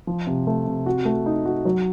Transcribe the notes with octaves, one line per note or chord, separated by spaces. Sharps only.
F3
C3
A3
C3
F#4
A3
D#4
F#4
F#3